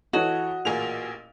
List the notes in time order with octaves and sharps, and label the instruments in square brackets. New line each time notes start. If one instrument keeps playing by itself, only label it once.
[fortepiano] E3 A4 C#5 [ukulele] F#4 [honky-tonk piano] D#5
[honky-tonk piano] A1 G#4 F7 [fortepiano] A#2